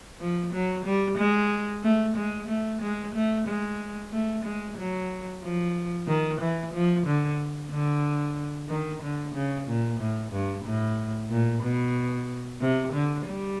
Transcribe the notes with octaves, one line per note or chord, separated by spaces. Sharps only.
F3
F#3
G3
G#3
A3
G#3
A3
G#3
A3
G#3
A3
G#3
F#3
F3
D#3
E3
F3
D3
D3
D#3
D3
C#3
A#2
A2
G2
A2
A#2
B2
C3
D3
G3